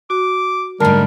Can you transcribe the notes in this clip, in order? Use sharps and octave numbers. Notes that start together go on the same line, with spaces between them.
F#4 D6
G#2 D3 G3 A3 A#4 A5